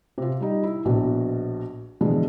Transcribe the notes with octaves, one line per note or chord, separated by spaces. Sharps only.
C3 F4
G3 D#4
E4
A#1 B2 F#4
B2 D3 E3 F3 G#3